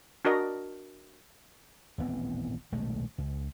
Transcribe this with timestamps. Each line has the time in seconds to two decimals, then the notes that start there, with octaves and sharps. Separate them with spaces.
0.25 D4 F#4 A#4 D#5
1.98 D#1 A1 B3 C4
2.72 D#1 B1 G#3 A3
3.18 C#2